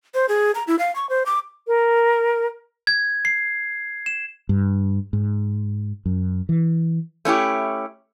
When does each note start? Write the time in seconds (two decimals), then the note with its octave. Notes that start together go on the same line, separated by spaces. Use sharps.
0.14 C5
0.29 G#4
0.55 A#5
0.67 E4
0.79 F5
0.96 C#6
1.09 C5
1.26 D6
1.67 A#4
2.87 G#6
3.25 C7
4.06 E7
4.49 G2
5.13 G#2
6.06 F#2
6.49 E3
7.25 A3 C#4 E4 G4